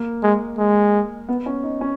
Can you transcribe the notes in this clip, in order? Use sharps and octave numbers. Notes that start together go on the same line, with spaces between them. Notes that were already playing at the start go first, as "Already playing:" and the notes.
Already playing: A#3
G#3
G#3
B3
C#4
D#4
C#4